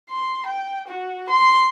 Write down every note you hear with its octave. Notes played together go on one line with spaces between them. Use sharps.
C6
G5
F#4
C6